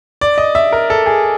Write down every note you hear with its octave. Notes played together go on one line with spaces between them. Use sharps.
D5
D#5
E5
A#4
A4
G#4